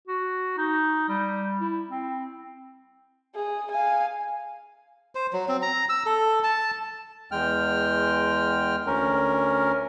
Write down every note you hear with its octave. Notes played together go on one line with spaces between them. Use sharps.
F#4
D#4
G3
E4
C4
G#4
F5 G#5
C5
F#3
C4
A#5
E6
A4
A5
E2 G#3 G5 F6
D2 C#4 A#4